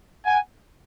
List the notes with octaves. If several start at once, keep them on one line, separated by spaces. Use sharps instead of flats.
F#5 G#5